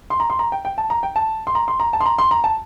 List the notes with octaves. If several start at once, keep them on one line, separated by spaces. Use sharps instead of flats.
C6
A#5
C6
A#5
G5
G5
A5
A#5
G5
A5
C6
A#5
C6
A#5
A5
C6
A#5
C6
A#5
A5